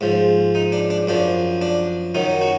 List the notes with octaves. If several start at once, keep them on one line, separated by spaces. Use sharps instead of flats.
G#2 F3
D#4
D4
D4
F#2 F3 D4
D4
F#2 D#3 F#3 D#4
F#4